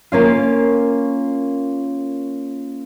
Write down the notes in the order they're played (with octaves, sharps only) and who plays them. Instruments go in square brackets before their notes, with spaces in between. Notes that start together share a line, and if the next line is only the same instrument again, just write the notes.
[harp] A#3 C#4 F4